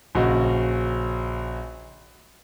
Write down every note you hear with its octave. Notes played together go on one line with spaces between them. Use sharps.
A#1 C#3 F#4 D#5